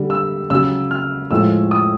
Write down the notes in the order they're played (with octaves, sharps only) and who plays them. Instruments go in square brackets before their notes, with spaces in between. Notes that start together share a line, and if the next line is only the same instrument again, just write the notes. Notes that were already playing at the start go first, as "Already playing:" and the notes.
Already playing: [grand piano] D3 G3
E6
C#3 F#3 E6
F6
A2 F3 G#3 E6
D#6